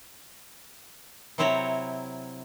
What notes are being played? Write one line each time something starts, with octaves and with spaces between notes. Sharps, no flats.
C3 F#3 C4 E4 C#5 A#5